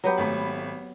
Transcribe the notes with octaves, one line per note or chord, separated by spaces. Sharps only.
F#3 B3 G4
G#1 A3 B5